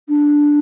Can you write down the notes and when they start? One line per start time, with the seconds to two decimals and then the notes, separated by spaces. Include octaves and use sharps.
0.08 D4